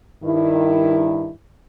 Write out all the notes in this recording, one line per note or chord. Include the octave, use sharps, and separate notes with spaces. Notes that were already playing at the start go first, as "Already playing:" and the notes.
G2 D#3 E4